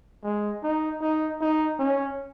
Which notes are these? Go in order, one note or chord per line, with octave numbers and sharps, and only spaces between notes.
G#3
D#4
D#4
D#4
C#4